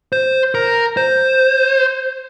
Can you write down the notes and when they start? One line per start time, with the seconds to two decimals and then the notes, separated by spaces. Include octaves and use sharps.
0.12 C5
0.55 A#4
0.97 C5